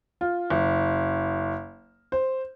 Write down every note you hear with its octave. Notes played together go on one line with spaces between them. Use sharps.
F4
F#1
C5